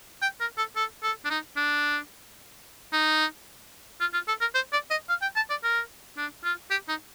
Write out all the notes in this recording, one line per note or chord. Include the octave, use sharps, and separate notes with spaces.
G5
A#4
A4
A4
A4
D4
D#4
D4
D#4
F4
F4
A4
A#4
C5
D5
D#5
F5
G5
A5
D5
A#4
D4
F4
G4
D#4